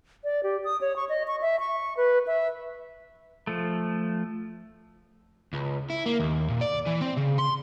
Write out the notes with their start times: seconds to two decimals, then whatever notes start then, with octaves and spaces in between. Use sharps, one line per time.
0.24 D5
0.43 G4
0.65 D#6
0.81 C#5
0.96 C#6
1.09 D#5
1.28 C#6
1.42 E5
1.60 C#6
1.97 B4
2.27 E5
3.47 F3 A3
5.54 C#2
5.90 E4
6.06 A#3
6.20 D#2
6.50 A#2
6.61 D5
6.87 E3
7.02 C4
7.17 C#3
7.39 C6